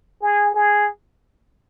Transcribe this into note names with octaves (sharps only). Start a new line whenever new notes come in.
G#4
G#4